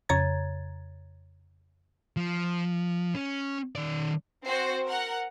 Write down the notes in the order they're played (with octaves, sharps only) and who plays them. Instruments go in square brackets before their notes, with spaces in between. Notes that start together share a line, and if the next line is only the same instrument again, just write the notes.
[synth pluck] F2 C#3 C#5 A#5 G#6 A6
[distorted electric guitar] F3
C#4
D#3 D5
[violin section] C4 F#4 C5
A#4 F#5